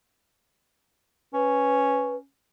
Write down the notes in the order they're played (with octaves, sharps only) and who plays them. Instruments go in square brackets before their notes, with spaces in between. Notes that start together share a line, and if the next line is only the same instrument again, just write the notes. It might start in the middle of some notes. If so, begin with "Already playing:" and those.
[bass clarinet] C#4 [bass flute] B4